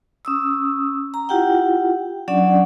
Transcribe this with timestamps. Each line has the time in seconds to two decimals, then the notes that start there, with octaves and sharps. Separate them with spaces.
0.25 C#4 D#6 E6
1.14 A#5
1.29 E4 F4 G4 F#5 G5
2.28 F#3 C#4 D4 D5 F#5